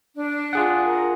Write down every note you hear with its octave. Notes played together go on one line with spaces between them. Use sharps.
D4
F4 G#4 F#5
A#4